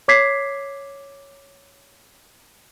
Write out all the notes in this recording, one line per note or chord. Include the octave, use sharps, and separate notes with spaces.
C#5 D6 G#6 B6 C7